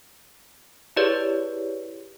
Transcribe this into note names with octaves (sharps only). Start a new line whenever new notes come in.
E4 G4 G#4 B4 C#5 D5